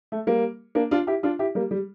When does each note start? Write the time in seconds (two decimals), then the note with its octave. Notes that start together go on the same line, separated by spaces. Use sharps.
0.12 A3
0.27 G3 A#3
0.75 A#3 D4
0.91 D4 F4
1.07 E4 G4
1.23 D4 F4
1.39 E4 G4
1.55 G3 A#3
1.71 G3